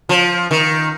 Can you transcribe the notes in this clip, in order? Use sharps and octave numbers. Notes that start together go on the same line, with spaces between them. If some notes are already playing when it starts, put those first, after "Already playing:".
F3
D#3